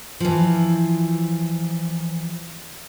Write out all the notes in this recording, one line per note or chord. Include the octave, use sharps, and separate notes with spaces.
E3 F3